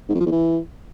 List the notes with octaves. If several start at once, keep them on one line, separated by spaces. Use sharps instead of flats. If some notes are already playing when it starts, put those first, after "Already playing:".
G#2
F2
F3
E2
E3